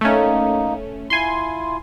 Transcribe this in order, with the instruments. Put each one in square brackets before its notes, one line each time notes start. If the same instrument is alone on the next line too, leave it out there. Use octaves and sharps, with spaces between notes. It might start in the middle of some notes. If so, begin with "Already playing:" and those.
[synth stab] A3 C#4 [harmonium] A#3 D#4
[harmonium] E4 F4 [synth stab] G#5 C6